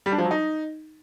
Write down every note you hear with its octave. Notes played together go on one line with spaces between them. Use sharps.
G3
D4
F3
F#3
D#4